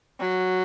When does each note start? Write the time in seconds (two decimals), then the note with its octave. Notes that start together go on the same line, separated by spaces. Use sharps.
0.20 F#3